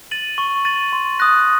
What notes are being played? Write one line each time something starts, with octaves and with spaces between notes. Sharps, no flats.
A6 D#7 F#7
C#6
A6 D#7 F#7
C6
D#6 F#6 A#6